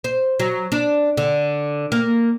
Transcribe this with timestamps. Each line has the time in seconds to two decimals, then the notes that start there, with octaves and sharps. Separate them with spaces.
0.04 C5
0.40 F#3
0.72 D4
1.17 D3
1.92 A#3